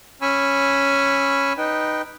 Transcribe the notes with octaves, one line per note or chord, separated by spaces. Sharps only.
C#4 G#5 B5 C#6 E6
D#4 B4 G5